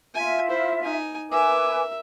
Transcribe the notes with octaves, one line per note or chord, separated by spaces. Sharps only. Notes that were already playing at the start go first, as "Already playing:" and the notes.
F4 E5 G#5
E4 C5
D#4 G#5
A#4 B4 E5 G#5 D6